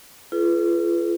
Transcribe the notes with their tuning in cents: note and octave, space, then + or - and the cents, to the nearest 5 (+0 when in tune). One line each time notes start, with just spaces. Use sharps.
F4 -35 G#4 +40 B4 +0